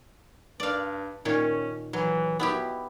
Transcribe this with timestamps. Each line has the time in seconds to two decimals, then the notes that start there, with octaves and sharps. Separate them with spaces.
0.60 G2 D5 F5
1.25 A#2 D#3 C#4 C#5
1.93 E3 F#3
2.40 B2 B3 E4 G4